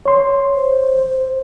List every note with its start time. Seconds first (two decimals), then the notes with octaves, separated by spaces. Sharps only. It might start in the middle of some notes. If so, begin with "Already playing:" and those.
0.06 C#5 C6
0.54 C5